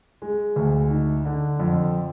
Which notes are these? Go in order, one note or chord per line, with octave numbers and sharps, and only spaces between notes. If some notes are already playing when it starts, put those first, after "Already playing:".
G#3
D2
D#4
D3
F2